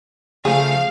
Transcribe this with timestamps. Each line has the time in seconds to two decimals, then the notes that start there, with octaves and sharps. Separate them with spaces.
0.45 C#3 F3 A3 G#4 F5